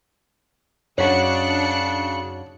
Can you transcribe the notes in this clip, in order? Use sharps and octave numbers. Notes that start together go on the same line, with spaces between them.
F#2 C#3 D4 D#4 F#4 C#5 F#6 C#7